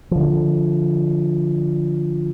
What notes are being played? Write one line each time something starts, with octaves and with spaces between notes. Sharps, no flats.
D3 F3